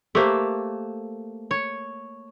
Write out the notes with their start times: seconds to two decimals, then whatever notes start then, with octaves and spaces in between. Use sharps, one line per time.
0.15 A3 A#3 G4 C5
1.51 C#5